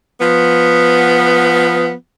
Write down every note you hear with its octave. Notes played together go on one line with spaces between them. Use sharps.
F3 B3